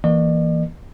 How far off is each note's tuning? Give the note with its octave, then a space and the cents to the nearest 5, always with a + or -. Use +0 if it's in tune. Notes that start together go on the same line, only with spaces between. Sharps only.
E3 +0 A#3 +0 D5 +45